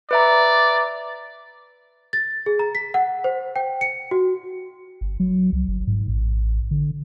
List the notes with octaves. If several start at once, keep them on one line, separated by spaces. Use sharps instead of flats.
B4 D5 E5 A#5
A6
G#4
A#5
B6
F#5
C5
G5
C#7
F#4
G1
F#3
C2
G1
G#2
A1
D3